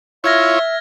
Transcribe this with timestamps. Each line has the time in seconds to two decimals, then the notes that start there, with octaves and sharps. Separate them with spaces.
0.24 E4 F4 C#5 E5 F6 G#6 A#6